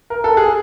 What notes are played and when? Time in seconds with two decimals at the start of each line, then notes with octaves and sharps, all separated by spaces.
0.10 A#4
0.24 A4
0.37 G#4